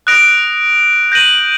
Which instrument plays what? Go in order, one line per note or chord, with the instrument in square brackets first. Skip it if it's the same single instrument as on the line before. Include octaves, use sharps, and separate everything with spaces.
[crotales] D#6 F#6 A#6 D7
G6 A#6 D#7 F#7